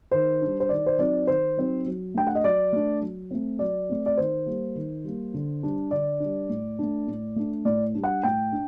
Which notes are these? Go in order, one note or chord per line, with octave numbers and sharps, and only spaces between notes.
D#3 C5
G3 D4
C5
D#3 D5
C5
F#3 C4 D#4 D5
D#3 C5
F#3 C4 D#4
F#3
A3 D4 G5
F#5
D#5
F#3 D5
A3 D4
F#3
A3 C4
F#3 D5
A3 C4
D5
D#3 C5
G3 A#3
D#3
G3 A#3
D3
G3 D4
D3 D5
G3 D4
A2
A3 D4
A2
A3 D4
A2 D5
G3 D4
F#5
A2 G5
D4